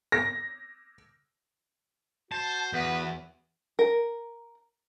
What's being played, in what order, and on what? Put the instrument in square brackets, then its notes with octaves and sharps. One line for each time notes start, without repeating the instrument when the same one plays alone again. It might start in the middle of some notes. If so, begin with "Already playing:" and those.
[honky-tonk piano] A#6
[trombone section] F#4 [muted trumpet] C5 [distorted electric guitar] A5
[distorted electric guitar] E2 [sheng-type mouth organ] B3 [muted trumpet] B4
[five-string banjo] A#4